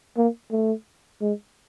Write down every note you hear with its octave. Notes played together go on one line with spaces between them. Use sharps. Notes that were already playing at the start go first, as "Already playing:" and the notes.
A#3
A3
G#3